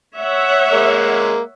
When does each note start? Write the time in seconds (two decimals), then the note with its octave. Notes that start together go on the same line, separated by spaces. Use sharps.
0.17 C#5 E5 F#5
0.73 G#3 A#3